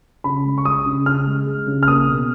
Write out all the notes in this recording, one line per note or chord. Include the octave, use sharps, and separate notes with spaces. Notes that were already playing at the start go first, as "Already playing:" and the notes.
C#3 B5
G#3
C#6
G#3 D#6
C#3
C#3 F6
G#3
G#3
C#3
F6
A#3 D#6
B2